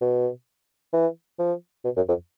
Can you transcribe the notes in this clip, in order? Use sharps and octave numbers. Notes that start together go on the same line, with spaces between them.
B2
E3
F3
B2
F#2
F2